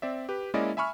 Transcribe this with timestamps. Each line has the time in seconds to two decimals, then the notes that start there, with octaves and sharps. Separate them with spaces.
0.02 C4 D5 E5
0.29 G4 B4
0.54 G#3 A#3 C#4 E4 D5 D#5
0.77 E5 G#5 B5 C#6 F6